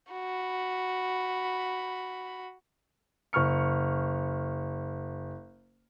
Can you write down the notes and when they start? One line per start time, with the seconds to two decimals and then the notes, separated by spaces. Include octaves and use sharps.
0.12 F#4 B5
3.33 F#1 C#6 F6 C#7